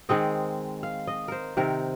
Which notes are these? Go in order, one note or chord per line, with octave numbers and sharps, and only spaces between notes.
D#3 G#3 C4 D#5
F5
D#5
A#4 C5
C3 D#3 C4 A#4